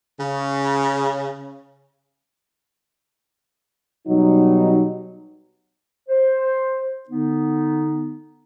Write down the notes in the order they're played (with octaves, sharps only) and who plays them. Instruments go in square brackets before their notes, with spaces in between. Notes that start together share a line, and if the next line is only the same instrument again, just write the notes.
[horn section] C#3
[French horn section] B2 F#3 G3 D#4
[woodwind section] C5
D3 B3 D#4